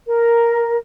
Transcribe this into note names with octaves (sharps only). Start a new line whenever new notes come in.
A#4